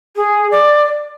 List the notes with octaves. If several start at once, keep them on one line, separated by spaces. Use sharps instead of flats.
G#4
D5